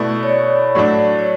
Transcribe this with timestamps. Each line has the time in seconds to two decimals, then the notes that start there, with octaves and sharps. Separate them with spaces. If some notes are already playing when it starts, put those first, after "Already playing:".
Already playing: B2 A3 E4 B4 D5
0.23 C#5
0.30 D5
0.75 A2 F#3 A3 D4
1.19 C#5